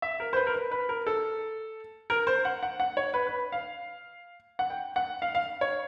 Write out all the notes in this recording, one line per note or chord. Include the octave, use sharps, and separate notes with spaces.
E5
A#4
C5
B4
A#4
B4
B4
A#4
A4
A#4
C5
F#5
F#5
F#5
C#5
B4
B4
F5
F#5
G5
F#5
F5
F5
C#5